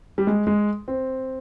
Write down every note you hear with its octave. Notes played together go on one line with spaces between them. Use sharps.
G3
G#3
G#3
C4